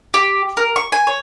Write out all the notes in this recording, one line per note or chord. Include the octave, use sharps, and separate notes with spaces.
G4
A#4
C#6
G#5
C#5